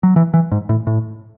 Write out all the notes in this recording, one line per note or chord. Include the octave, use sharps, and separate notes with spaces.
F#3
E3
E3
G#2
A2
A2